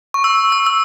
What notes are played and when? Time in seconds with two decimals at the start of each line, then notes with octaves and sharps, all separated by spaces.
0.14 C#6
0.24 E6
0.52 E6
0.66 E6